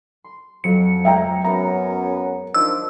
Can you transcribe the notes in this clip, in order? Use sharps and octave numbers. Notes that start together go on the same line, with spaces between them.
C6
F2 F#3 C#7
G#3 C4 G#4 E5 G5 A#5
F#2 B3 A#5
D#3 F3 D4 E6